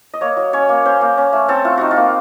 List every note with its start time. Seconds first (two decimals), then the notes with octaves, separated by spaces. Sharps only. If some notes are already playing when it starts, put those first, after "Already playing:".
0.14 D#5
0.21 A#3 C#5
0.37 F#3
0.53 C#4 C#5
0.69 A#3
0.85 C#4 C5
1.01 A#3
1.18 C#4
1.33 A3
1.48 C4 A4
1.65 A3 F4
1.77 D#4 F#4
1.91 F4
1.97 A#3